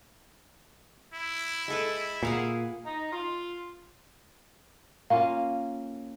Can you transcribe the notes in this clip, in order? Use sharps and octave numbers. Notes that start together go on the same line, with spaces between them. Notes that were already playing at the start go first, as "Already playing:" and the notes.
E4
G#3 A4 B4
A#2 G#4 F5 F#5
D#4
F4
A#3 C#4 F4 F5